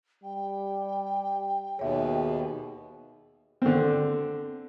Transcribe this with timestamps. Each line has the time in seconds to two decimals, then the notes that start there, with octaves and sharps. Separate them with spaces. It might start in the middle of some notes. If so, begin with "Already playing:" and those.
0.24 G3 G5
1.79 D#2 B2 G#4 C#5 E5
3.62 D3 C4